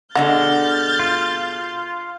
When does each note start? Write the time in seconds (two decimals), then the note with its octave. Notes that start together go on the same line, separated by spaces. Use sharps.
0.15 B2 D3 G#3 F#5 F6 G6 A6
1.00 F4